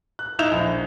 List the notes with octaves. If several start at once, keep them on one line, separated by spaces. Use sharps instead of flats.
F#6
D#4 E4 E5 G6 F7
A#1